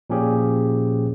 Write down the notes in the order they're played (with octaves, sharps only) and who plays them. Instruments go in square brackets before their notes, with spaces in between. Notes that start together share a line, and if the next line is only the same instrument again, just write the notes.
[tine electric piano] A#2 F3 C#4 G4 G#4